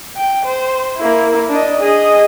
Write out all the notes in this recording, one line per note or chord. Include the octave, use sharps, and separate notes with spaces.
G5
C5
A#3 E4
D4 D#5
G#4 D#5